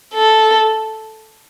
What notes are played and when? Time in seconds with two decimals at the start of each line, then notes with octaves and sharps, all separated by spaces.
0.14 A4